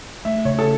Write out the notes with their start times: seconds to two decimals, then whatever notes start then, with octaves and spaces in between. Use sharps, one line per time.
0.25 A3 E5
0.45 C#3 C#5
0.59 A4